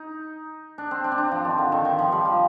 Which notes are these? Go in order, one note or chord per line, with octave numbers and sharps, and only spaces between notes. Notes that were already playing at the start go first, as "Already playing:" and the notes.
Already playing: D#4
D4
C4
D4
C4
D4
F3
D#3
D3
D#3
D#3
F3
G3
F3